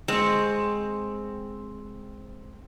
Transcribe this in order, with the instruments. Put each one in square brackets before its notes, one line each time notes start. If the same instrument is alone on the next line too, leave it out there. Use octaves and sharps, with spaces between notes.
[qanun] G#3 C#6 [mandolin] C4